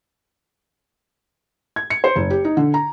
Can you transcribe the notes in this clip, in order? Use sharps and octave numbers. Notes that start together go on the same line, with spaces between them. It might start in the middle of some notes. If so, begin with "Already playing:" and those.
G#6
C#7
C5
F#1
G4
D#4
D3
A#5